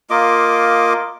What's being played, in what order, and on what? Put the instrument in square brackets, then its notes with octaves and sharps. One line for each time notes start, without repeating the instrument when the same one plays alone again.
[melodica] A#3 F4 D#5 D6